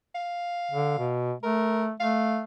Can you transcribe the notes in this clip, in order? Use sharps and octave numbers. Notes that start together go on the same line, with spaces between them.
F5
D3
B2
A3 A#4
A3 F5